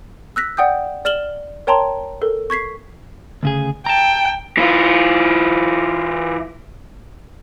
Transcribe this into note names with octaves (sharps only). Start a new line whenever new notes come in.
E6 F#6 A#6 B6
D5 F#5 G5 D#6 G6
D5 F6 E7 F#7 G7
A#4 C#5 G5 A5 A#5 C6
A4 A#4
C#6 G#6 B6 C7
D2 C#3 G#4
G5 A5 A#5
E3 F4